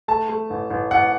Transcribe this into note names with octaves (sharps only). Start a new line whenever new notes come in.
A3 A5
A3
A1
A1
A1 F#5